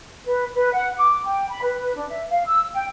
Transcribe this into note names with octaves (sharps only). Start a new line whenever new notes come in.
B4
B4
F#5
D6
G5
B5
B4
D4
E5
F5
E6
G5